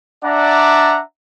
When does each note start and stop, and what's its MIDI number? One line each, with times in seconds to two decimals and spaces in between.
0.24 1.01 62
0.24 1.01 74
0.24 1.01 76
0.24 1.01 78
0.24 1.01 82